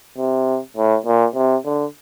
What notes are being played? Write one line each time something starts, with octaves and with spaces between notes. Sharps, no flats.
C3
A2
A#2
C3
D3